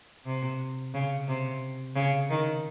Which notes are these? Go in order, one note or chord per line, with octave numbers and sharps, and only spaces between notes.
C3
C#3
C3
C#3
D#3